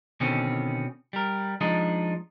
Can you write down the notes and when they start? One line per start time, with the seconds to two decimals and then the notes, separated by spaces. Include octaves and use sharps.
0.20 B2 D3 D#3 C4 C#4
1.13 G3 A#4
1.61 F3 G#3 D4 D#4